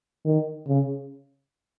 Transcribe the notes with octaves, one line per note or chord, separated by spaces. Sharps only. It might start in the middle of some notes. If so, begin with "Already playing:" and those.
D#3
C#3